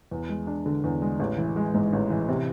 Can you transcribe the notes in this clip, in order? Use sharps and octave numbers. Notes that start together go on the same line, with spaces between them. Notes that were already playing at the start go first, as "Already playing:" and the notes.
E2
G#3
D4
D3
E2
G#3
A1
E3
G#3
G#2
A1
E3
C3